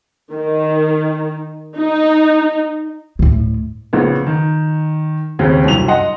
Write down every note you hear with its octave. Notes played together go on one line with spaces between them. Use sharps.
D#3
D#4
D2 A2
A#1 C#3 B3
D#3
D#2 C#3 C4 C#4
G1 C2 F#2 F7
D#5 F#5 C6